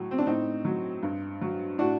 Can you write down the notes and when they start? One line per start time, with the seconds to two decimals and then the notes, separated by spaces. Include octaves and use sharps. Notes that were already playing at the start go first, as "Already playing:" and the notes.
Already playing: A2 F#3
0.11 C4
0.18 D4
0.26 A2 C4 D#4
0.65 F#3
1.03 G2
1.41 F#3
1.78 A2 D4 F#4